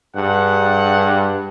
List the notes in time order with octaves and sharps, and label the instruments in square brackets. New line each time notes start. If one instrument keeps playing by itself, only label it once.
[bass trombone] G2 [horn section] G#4 F#5